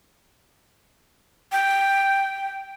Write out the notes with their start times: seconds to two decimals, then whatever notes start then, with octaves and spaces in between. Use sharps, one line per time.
1.52 G5